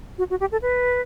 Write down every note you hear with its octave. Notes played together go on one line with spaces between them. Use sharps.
F#4
F#4
G4
A4
B4